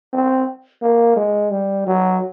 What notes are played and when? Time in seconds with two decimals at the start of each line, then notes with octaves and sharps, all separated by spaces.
0.13 C4
0.82 A#3
1.16 G#3
1.51 G3
1.87 F#3